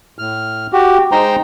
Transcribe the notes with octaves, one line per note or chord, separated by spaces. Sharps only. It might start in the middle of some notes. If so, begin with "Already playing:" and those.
A2 F6
F#4 G4
G#3 D#4 C5 G5 A#5 C6